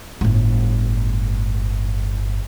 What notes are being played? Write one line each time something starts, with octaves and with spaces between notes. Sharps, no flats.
G1 A2